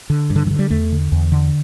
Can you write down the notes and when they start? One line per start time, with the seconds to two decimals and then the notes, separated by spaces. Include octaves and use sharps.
0.10 D3
0.30 G2
0.36 D3
0.47 E3
0.51 D3
0.59 G3
0.70 E2 A3
0.92 D3
1.12 E2
1.32 D3